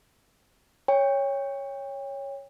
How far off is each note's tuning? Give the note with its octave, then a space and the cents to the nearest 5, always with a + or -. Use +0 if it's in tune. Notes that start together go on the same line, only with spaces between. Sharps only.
C#5 +0 G5 +35